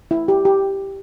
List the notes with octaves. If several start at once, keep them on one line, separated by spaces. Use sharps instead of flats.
E4
G4
G4